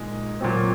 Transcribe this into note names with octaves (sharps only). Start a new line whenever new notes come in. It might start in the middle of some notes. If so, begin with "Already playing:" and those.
Already playing: A#2 G#3 D#4 G#4
A#2 F#3 C4